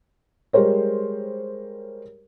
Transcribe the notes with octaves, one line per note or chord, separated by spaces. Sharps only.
G3 G#3 G4 A#4 C5 C#5